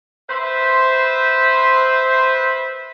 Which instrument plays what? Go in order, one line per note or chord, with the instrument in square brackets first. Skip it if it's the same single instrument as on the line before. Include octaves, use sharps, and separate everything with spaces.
[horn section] B4 C5 E5